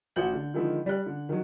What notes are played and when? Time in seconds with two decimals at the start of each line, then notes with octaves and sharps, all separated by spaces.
0.16 A1 F#4 G6 F#7
0.33 D3
0.54 D3 D#3 F3 G#3 E4
0.86 G3 F#6
1.06 D3
1.29 D#3 F#3